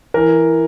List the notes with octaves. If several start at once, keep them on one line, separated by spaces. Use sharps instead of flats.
E3 A#4